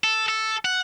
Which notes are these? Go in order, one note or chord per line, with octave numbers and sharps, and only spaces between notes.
A4
A4
F#5